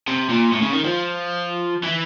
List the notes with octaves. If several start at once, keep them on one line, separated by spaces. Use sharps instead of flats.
C3
A#2
A2
C#3
D#3
F3
E3